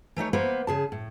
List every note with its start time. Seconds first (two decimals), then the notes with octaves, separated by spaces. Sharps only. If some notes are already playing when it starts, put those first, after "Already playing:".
0.16 E3 A3 D#4 C#5
0.33 E3 A#3 B3 B4 C5
0.67 C#3 G#4 A5
0.92 A2